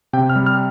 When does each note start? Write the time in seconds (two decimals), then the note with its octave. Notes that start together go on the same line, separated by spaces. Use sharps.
0.13 C3 G5
0.30 F6
0.36 G3
0.46 F6